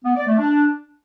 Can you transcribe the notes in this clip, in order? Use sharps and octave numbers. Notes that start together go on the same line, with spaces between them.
B3
D5
A3
D4